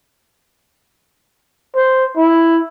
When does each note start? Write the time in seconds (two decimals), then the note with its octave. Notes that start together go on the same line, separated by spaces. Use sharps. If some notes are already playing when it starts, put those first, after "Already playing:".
1.76 C5
2.17 E4